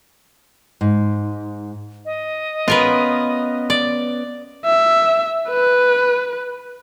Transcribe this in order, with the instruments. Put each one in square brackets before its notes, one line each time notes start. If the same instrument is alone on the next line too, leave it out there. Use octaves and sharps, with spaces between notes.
[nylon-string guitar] G#2
[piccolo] D#5
[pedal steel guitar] B3 C#4 [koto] F4 A#4 B4
[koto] D5
[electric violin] E5
B4